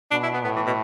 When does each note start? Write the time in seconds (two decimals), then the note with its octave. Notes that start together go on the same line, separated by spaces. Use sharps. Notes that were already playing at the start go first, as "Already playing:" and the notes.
0.11 B2 D4
0.23 E4
0.34 B3
0.45 A2 B3
0.56 E3
0.67 B2